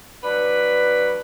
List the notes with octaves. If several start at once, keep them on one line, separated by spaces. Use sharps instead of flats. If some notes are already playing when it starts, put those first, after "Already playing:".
F#3 D4 B4